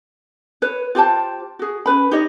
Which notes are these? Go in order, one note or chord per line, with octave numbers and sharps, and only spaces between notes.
B4 C#5
F4 G4 C5 A5
F#4 G#4
C#4 D4 B4 B5
D#4 G4 C#5 D#5